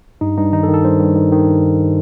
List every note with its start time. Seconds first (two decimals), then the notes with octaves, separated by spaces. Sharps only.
0.21 G2 D#4
0.37 G2 D#4
0.52 D#3 D#4
0.63 A4
0.69 D#3
0.74 A4
0.84 G2 C5
1.00 G2
1.16 D#3
1.32 D#3